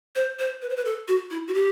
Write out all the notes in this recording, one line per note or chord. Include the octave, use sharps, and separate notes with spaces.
C5
C5
B4
C5
B4
A4
F#4
E4
F#4
G4